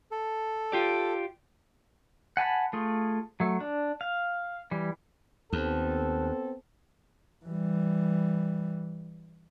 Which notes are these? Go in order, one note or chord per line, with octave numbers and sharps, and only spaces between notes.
A4
F4 G4 D5
F#5 G#5 A5 B5
A3 F4 G#4
F#3 A3
D4
F5
E3 G3
D#2 B3 C4 A4
E3 G3